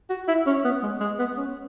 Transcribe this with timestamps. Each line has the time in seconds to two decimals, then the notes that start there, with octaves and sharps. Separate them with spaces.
0.10 F#4
0.28 E4
0.46 C#4
0.64 B3
0.83 G#3
1.00 G#3
1.19 B3
1.37 C#4